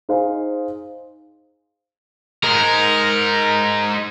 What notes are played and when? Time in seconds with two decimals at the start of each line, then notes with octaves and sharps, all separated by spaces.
0.09 D#4 G#4 C5 F5
2.43 G#2 G#3 A#4